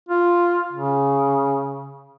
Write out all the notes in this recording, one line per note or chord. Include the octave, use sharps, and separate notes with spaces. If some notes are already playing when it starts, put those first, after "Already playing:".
F4
C#3